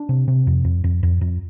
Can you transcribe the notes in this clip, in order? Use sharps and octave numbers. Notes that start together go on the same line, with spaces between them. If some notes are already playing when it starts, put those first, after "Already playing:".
Already playing: D4
C3
C3
F2
F2
F2
F2
F2